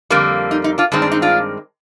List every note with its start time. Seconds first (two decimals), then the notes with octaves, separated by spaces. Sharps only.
0.10 F2 D3 G3 A#3
0.51 D#4
0.64 D#4
0.78 D4 F4
0.92 G2 D#3 G#3 C4 D4
1.02 D4
1.12 D#4
1.22 D4 F4